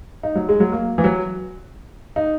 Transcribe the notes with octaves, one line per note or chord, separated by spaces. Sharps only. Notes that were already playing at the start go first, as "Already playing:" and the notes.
D#4
F#3
G#3
F#3
A#3
E3
F#3
D#4